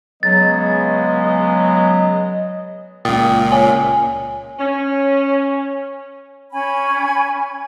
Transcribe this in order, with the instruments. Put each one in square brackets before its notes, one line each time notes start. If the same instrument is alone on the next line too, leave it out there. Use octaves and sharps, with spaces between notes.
[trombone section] C#3 G#3 B3 [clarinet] F#3 [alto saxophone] D#5 [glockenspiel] A6
[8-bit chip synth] C#2 A#2 [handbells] G5 D#6 A6
[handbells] C#5 [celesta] G#5
[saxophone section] C#4
[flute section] C#4 G#5 B5